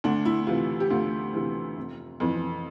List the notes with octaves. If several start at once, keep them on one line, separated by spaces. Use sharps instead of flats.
D2 D4
E4
C3 E3 F4
G4
D2 F4
C3 E3
F1
F2 E3